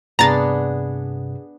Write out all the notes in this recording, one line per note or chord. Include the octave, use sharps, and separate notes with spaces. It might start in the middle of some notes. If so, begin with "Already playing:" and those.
G2 C3 B3 D4 G#4 A#5 A6